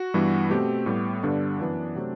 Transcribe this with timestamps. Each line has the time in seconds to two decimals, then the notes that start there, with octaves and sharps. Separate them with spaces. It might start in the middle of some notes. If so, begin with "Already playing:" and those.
Already playing: F#4
0.14 G2 E3 G3 B3
0.50 B2 A3 C4 G4
0.86 A2 G3 B3
1.23 G2 D3 G3 B3 D4
1.59 F#2 E3 B3
1.95 C3 F#3 A3 C4